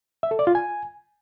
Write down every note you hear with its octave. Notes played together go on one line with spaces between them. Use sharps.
E5
A4
D5
F4
G#5